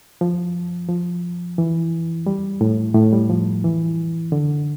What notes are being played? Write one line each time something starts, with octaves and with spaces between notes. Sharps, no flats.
F3
F3
E3
G3
A2
A2
G3
F3
E3
D3